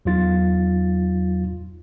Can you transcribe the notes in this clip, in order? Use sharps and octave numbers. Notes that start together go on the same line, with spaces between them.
E2 F#3 D#4 F4 A6